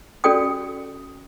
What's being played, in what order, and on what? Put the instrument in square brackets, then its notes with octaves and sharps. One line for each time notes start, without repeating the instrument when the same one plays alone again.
[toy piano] C#4 F#4 A4 D5 G5 D#6